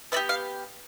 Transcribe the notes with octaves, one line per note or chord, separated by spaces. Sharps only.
B3 D4 G4 E5
F5